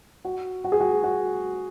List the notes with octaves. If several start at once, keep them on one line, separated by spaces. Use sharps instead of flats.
F#4
F#4
G#4
F#4
F#4